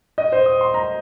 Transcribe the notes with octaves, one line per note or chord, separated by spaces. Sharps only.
D#5
C5
D#6
C6
A#5